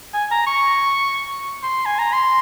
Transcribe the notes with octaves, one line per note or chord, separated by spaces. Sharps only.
G#5
A#5
C#6
C6
G#5
A#5
C6